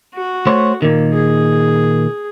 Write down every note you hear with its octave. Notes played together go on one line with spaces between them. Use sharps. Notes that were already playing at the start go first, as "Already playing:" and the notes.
F#4
A3 C5 C#5
A#2 D#3 A#3
G#4